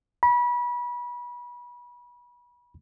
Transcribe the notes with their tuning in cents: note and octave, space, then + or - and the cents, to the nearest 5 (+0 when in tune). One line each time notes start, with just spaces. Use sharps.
B5 -30